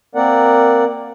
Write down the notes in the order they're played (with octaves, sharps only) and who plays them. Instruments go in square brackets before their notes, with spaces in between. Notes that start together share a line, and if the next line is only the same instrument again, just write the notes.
[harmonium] A#3 C4 A#4 D5 F#5